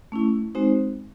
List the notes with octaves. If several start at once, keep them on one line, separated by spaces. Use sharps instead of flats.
A3 C#4 E4
G#3 C4 D#4 F#4 C5